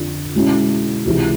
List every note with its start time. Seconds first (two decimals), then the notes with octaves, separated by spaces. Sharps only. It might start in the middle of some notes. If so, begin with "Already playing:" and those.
Already playing: F2 D3 F3
0.35 B2 G#3 C#4 E4
1.05 C#2 C3 E3